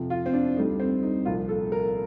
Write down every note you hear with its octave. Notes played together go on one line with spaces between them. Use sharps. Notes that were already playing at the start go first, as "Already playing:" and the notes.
Already playing: F2 C3 F3
F4
C4
D4
D2 D3 G3 D#4
C4
D#4
C2 A#2 F3 F4
A4
A#4